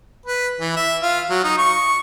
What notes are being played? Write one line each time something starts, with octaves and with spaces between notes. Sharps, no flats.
B4
E3
E5
F4
F#3
D#4
C#6